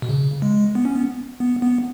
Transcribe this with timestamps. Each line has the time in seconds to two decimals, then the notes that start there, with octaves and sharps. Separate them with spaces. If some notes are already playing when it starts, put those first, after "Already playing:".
0.02 B2
0.09 C#3
0.42 G#3
0.75 B3
0.85 C#4
0.95 B3
1.40 B3
1.62 B3